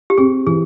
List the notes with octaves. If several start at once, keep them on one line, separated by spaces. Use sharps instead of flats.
G4
C4 G#4
E3 G#4